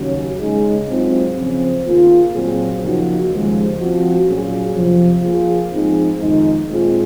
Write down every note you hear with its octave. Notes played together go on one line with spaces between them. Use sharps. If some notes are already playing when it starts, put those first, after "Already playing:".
Already playing: D#2 C#3 F#3 C#4
C#3 G#3 D#4 G#4
G#2 F#3 C4 F4
C#3 F3 C4
D#3 A#3 F4 G#4
A#2 F#3 C4 F4 G#4
C#3 F3 A#3 D#4 F#4
D#2 C#3 F3 G#3
F3 C4 F#4
A#2 F#3 C#4 F4 G#4
F2 C3 F3
F3 A#3 F4 G#4
G#2 F3 C4 D#4 G#4
F2 D#3 G#3 D#4
A#2 G#3 C4 F4 G#4